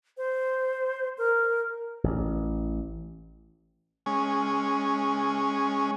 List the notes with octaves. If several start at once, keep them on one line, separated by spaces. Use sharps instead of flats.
C5
A#4
A1
G#3 C#4